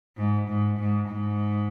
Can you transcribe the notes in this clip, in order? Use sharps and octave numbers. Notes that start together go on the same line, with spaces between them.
G#2
G#2
G#2
G#2